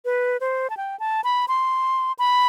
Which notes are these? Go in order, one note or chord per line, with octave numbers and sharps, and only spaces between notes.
B4
C5
A5
G5
A5
B5
C6
B5